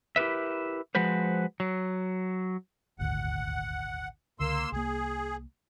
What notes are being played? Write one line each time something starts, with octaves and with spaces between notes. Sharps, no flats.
E4 G4 A#4 B4 E5
F3 G#3 F#4 B4 C5
F#3
D#1 G#1 D2 F#5
C#2 D3 A#3 C6 E6
C2 A#3 G#4